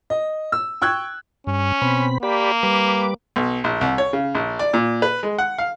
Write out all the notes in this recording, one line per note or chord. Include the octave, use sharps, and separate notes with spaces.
D#5
E6
G5 C#6 E6 F#6 G#6
G2 C#4
B2 C4 B5
A#3 G4 D5 B5
G3 B4 D6
B1
A#1
C2
C#5
C#3
A#1
D5
A#2
B4
G#3
F#5
F5